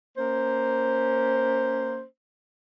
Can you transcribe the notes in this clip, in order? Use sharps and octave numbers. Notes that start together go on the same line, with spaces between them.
A#3 C#4 C5